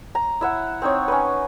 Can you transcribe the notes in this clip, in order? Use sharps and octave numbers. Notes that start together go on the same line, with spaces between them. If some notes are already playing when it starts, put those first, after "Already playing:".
A#5
E4 E5 F#5
C4 D#4 C#5
C#4 D#4 B4